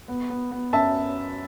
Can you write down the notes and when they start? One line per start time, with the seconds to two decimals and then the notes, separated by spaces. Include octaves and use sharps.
0.08 B3
0.30 B3
0.51 B3
0.73 F#2 E5 A5